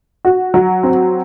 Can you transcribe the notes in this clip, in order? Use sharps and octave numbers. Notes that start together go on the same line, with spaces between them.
F#4
F#3
C4